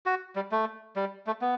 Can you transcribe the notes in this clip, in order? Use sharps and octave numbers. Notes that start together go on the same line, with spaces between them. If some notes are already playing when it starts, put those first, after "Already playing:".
F#4
G3
A3
G3
A3
B3